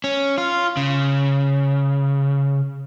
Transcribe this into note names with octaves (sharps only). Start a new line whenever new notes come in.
C#4
F4
C#3